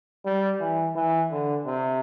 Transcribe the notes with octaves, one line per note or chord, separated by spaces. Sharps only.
G3
E3
E3
D3
C3